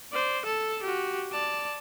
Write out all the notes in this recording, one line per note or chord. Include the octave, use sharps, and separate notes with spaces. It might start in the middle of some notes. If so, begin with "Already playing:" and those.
C5 D5
A4 A5
F#4 G4
D5 A5